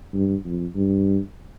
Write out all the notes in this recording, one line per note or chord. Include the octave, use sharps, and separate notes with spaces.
G2
F2
G2